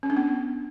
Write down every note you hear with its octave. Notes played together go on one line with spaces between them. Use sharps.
C#4
D4
B3